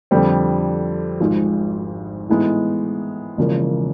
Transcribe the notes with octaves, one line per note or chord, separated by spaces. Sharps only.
F2 D3 G3 C4
G#1 G#2 F3 G#3
A2 E3 G#3 B3 D#4
E1 E2 C#3 F3 A#3